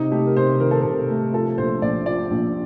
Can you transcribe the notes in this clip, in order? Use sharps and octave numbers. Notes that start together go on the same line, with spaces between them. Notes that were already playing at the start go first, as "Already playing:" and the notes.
Already playing: C3 D#4
A3 G4
A#4
C3 C5
D#3 A#4
A4
C3 A#4
A3
F3 A4
A#1 C5
A#1 D5
A#2 D5
A#1